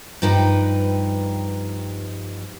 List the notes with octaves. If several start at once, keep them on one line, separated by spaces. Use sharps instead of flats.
G2 F3 D#4 B4 G5